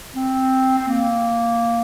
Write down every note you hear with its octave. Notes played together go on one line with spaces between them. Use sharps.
C4
C4
A#3